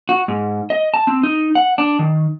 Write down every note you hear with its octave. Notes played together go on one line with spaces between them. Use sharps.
F#4
G#2
D#5
A5
C4
D#4
F#5
D4
D#3